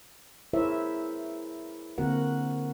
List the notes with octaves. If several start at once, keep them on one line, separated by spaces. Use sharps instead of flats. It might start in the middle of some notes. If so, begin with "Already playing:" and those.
E4 G#4 A#4 C5 C#5 E5
D3 A#3 C4 F#4 A#4 F#5